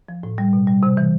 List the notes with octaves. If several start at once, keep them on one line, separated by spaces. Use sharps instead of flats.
F3
A2
G3
B2
G3
C3
E3